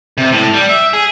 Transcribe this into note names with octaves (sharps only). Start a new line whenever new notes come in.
C3
A2
G3
E5
G#4